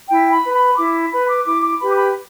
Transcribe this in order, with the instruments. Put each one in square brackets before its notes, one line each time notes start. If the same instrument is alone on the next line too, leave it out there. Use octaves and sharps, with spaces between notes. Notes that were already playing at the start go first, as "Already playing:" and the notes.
[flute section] E4 G5
B5
B4
B5
E4 D6
B4 B5
D6
E4 D6
D6
G4 B4 B5
D6
B5